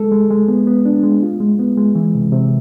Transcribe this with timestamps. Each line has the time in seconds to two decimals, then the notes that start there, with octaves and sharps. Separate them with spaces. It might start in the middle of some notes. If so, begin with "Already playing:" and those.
Already playing: G#3 A4
0.12 G#3
0.30 G#3
0.48 B3
0.67 B3
0.85 D4
1.03 G#3
1.23 F4
1.40 G#3
1.59 B3
1.77 G#3
1.95 E3
2.15 C3
2.32 C3